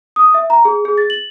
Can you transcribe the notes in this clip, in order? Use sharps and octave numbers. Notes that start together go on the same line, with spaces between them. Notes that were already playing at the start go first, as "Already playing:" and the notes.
D#6
E5
A#5
G#4
G#4
A6
F#7